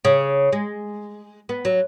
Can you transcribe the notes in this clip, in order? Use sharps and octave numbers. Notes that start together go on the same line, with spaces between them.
C#3
G#3
B3
F#3